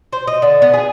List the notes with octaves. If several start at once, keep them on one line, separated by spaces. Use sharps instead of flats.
C5
D#5
D3
B3
G#4